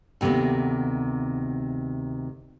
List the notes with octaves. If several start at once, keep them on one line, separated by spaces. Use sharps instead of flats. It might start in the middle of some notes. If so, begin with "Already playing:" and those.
D2 C3 D#3 A#3 B3